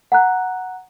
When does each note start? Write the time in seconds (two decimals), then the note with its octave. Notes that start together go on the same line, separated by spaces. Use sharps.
0.12 F#5 A#5 F#6